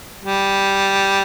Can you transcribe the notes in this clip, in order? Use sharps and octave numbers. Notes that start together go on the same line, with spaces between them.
G3